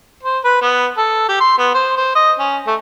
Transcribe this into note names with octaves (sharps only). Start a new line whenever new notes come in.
C5
B4
B3
A4
G4
C6
B3
C5
C5
D#5
C#4
A3